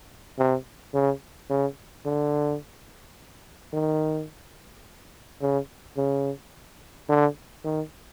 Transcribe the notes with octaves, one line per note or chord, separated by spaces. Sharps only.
C3
C#3
C#3
D3
D#3
C#3
C#3
D3
D#3